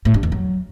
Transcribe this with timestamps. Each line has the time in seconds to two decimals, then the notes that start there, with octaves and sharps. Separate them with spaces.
0.05 A2
0.14 G2
0.23 E2
0.32 F#3